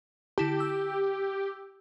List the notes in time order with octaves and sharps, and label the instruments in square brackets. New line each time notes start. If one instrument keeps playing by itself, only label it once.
[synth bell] D3 E4 A5 [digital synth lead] G4
[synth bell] E6